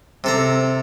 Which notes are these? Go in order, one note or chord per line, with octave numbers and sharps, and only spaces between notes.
C3 A4 A#5